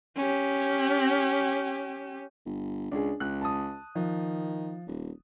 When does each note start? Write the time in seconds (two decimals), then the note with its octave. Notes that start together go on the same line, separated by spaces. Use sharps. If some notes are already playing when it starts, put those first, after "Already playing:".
0.17 C#4 G4
2.46 G1
2.91 C#2 D4 G#4
3.20 C#2 F#6
3.41 A5 D#6
3.95 D#3 F3
4.87 D#1